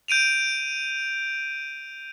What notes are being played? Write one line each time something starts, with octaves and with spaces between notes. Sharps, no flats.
G6 D7 D#7 F7